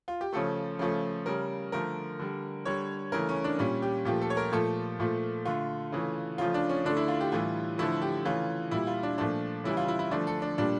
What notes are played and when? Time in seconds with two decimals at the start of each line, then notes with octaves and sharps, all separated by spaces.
0.08 F4
0.21 G4
0.33 C#3 F3 A3 A4
0.79 C#3 F3 A3
1.26 C#3 G3 A#4
1.72 D3 F3 A3 A#4
2.19 D3 G3
2.65 D3 G3 C#5
3.12 C#3 E3 A3 A#4
3.29 C#4
3.44 D4
3.59 A#2 G3 C#4
3.82 G4
4.05 A#2 F3 A3 G4
4.22 A4
4.30 C#5
4.37 A#4
4.52 A#2 F3 A3 A4
5.00 A#2 F3 A3
5.46 D3 A3 F4
5.92 C#3 E3 A3
6.38 C#3 F3 A3 F4
6.54 D4
6.69 C#4
6.85 D3 A3 D4
6.97 E4
7.08 F4
7.21 G4
7.32 A2 E3 G3 F4
7.78 D3 F3 A3 E4
8.02 G4
8.25 C#3 E3 A3 F4
8.71 A#2 G3 E4
8.87 F4
9.03 D4
9.18 A#2 F3 A3 D4
9.64 C#3 E3 G3 E4
9.77 F4
9.88 E4
9.99 E4
10.11 D3 F3 A3 D4
10.27 A4
10.42 D4
10.58 A#2 G3 D4